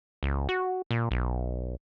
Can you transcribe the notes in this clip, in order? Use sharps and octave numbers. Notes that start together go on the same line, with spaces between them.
C#2
F#4
A#2
B1